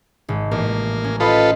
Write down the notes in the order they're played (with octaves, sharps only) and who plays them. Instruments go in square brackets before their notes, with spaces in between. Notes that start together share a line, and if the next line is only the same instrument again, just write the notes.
[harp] G#1
[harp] A1 [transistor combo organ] A#3
[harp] C#4
[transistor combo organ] F4 A4 B4 [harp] C5 D#5 B5